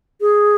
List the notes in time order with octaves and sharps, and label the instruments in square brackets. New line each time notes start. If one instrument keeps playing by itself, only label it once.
[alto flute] G#4